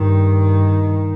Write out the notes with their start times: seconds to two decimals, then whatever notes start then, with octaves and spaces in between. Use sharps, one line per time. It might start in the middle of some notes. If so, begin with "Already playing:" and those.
Already playing: G2 D#3